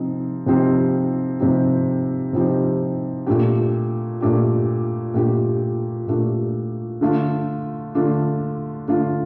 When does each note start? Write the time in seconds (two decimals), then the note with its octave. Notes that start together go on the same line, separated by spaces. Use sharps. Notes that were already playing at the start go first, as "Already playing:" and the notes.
Already playing: C3 F3 C4 D#4
0.46 C3 F3 C4 D#4 G4
1.40 C3 F3 C4 D#4 G4
2.33 C3 F3 C4 D#4 G4
3.27 A#2 A3 D4 G4
4.21 A#2 A3 D4 G4
5.14 A#2 A3 D4 G4
6.07 A#2 A3 D4 G4
7.01 D3 A3 D4 F4
7.95 D3 A3 D4 F4
8.88 D3 A3 D4 F4